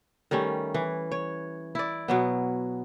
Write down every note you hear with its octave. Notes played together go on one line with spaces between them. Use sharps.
D#3 G3 A3 C#4
E3
C#5
E4 D5
B2 F#3 B3